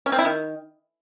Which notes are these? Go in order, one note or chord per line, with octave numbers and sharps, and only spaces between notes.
C#4
C4
E4
D#3